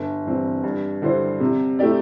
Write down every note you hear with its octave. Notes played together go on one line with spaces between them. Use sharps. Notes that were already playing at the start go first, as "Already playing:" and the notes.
Already playing: G1
G2 E3 C4
G2
D3 G3 E4 C5
C3
A3 E4 G4 D5